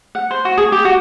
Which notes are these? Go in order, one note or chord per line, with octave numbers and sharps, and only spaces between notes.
F#5
C5
F#4
G#4
G4
F#4